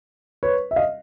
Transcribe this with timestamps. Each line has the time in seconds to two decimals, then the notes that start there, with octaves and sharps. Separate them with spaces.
0.43 B4 C#5
0.71 E5
0.76 D#5 F5